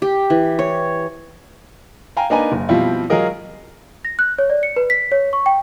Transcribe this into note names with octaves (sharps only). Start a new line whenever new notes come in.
G4
E3
C#5
F5 G5 G#5 A#5
A#3 D4 D#4 B4 G#5 A#5
F#1
B2 F3 G3 C4 E4 F4
F#3 G#3 F4 G#4 A#4 D#5
A#6
F#6
C#5
D5
C#7
B4
B6
C#5
C#6
G5